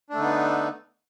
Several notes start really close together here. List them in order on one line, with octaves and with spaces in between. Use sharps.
D4 A3 D3 D#4 B3